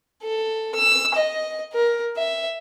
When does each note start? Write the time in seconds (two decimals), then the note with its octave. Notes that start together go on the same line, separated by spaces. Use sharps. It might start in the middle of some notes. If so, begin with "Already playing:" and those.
0.23 A4
0.75 E6
1.15 D#5
1.73 A#4
2.17 E5